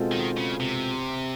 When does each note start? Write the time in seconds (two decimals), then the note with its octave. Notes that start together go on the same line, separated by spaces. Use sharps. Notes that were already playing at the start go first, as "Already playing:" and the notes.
Already playing: B2 G#3 C4 F4 A4
0.12 D#3
0.37 C#3
0.60 C3